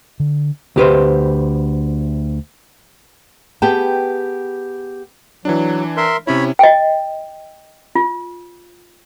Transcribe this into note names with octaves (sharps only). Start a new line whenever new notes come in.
D3
D2 G4 B4 C5
B3 G4 G#4 G5 A5
E3 F#3 D4
A#4 E5 C6
C3 C#4 E4 C#5 B5
D#5 G5
F4